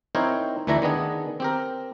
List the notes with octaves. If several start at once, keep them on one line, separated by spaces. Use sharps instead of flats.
C4 D#4 E4 A#4 C5 C#5
D2 E3 A3 D4 E4 A#5
D#3 B3 D4 G#4
C4 G4 A#4